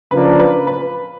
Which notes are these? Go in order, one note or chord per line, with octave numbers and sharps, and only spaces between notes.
C#3 F3 A#3 D4 B4
B4
B4